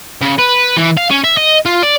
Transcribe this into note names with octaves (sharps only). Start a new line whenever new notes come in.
C#3
B4
E3
F5
C#4
E5
D#5
F4
D5